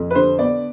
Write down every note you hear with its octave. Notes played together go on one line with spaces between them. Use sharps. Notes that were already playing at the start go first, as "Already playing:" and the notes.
Already playing: F2
B4
D3 C5
B3 D5